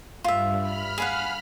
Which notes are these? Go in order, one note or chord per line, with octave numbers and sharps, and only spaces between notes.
G2 F4 E5
B5 F6
G#4 F5 F#5